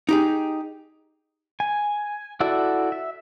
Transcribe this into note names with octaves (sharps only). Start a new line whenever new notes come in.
D#4 G4 G#4
G#5
E4 F#4 A4 D5 E5
E5